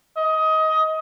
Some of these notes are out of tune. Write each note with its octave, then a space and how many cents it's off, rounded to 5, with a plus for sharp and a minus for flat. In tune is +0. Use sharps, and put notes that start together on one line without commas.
D#5 +20